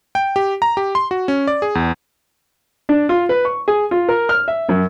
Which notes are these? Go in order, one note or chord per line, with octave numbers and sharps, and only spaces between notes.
G5
G4
A#5
G4
C6
F#4
C#4
D5
G#4
E2
D4
F4
B4
C#6
G#4
F4
A#4
F6
E5
F#2